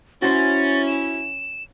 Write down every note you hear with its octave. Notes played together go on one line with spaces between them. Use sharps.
C#4 E4 F#4 C5 A6
E7